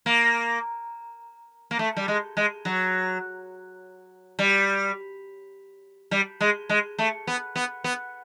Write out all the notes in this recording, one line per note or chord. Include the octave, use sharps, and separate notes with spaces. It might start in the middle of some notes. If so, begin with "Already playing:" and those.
A#3
A#3
A3
G3
G#3
G#3
F#3
G3
G3
G#3
G#3
A3
B3
B3
B3